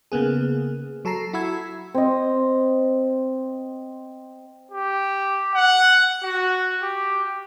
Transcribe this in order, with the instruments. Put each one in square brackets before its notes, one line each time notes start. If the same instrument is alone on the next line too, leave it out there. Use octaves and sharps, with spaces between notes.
[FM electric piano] C#3 A#3 B3 G#4
F#3 A4 A5 A#5 C7
E4 F#4 B5 E6 G#6
[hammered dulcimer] C4 D#5
[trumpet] G4
F#5
F#4
G4